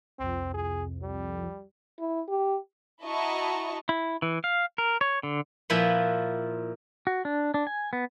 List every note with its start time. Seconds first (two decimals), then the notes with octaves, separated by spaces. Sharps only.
0.19 C2 F2 C4
0.54 G#4
1.02 G3
1.99 E4
2.28 G4
3.04 E4 F#4 D#5 A5 A#5 C#6
3.89 E4
4.22 E3
4.44 F5
4.78 A#4
5.01 C#5
5.23 D3
5.70 A#2 F3 E4 B4 F#5
7.07 F#4
7.25 D4
7.54 D4
7.67 G#5
7.93 B3